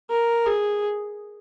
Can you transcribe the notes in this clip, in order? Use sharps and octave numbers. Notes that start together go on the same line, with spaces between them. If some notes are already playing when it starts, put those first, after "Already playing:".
A#4
G#4